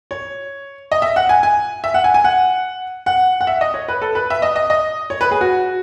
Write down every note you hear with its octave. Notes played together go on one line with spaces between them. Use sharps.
C#5
D#5
E5
F#5
G#5
G#5
E5
F#5
G#5
G#5
F#5
F#5
F#5
E5
D#5
C#5
B4
A4
B4
E5
D#5
D#5
D#5
C#5
B4
G#4
F#4